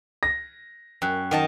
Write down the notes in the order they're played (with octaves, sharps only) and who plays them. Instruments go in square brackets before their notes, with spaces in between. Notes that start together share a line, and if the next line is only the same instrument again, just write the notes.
[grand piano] A#6
[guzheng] F#2 [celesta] G5 F#6
[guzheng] D#3 D#5 A5 [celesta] F#5 G5